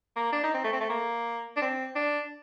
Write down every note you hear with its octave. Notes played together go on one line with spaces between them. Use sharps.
A#3
D4
D#4
C4
A3
C4
A3
A#3
D4
C4
D4